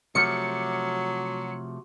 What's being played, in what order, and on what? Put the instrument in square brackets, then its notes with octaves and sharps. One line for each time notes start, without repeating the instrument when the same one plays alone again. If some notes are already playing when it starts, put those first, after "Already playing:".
[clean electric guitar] C3 F3 A3 [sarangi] F#3 [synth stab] C#7